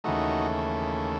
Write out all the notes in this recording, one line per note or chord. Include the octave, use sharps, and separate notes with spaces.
D#2 C#3 E3 A3 D#4 F#4